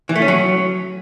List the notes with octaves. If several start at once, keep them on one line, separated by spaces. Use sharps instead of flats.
E3
A3
C#4
F#3